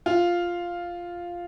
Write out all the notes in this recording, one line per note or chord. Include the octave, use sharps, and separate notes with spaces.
F4